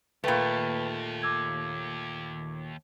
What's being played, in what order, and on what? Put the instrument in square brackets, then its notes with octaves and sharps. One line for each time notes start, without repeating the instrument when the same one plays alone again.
[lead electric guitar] D#2 [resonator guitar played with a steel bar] A#2 A3 [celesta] B4 G5 B5
[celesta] D6 E6 G#6